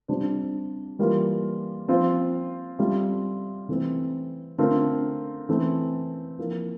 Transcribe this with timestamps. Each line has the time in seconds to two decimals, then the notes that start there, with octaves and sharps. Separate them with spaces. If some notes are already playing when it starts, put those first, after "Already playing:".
0.08 C3 G3 D4 F4 C5
0.99 E3 G3 A#3 F4 A#4
1.88 F3 C4 F4 C5
2.79 G3 C4 F4 A4 E5
3.68 C3 E3 A3 C4
4.58 D3 A3 C4 F4 A#4
5.49 E3 A3 C4
6.39 F3 A#3 E4 A#4